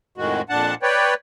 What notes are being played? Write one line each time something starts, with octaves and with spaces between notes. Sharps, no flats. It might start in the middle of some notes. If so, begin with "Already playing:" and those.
F2 A2 D#3 G#3 F#4
F2 A#2 D4 F#5 A5
B4 C#5 D5 G5